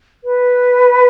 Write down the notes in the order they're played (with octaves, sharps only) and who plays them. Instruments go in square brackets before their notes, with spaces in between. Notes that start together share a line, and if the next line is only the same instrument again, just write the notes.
[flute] B4